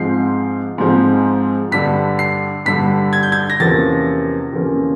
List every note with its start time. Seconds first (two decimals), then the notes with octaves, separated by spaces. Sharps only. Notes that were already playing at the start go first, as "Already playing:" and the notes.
Already playing: G#2 F3 G#3 C4 C7
0.78 G#2 F3 G#3 C4
1.72 G2 D3 G3 B6
2.19 C7
2.66 G2 D3 G3 B6
3.13 G#6
3.23 G6
3.32 G#6
3.50 A#6
3.60 E2 C3 F3 A#3 C#4 A6
4.53 E2 C3 F3 A#3 C#4